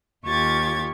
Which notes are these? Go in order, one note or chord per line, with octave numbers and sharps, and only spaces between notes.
D#2 F4 G4 C#6 G#6 A6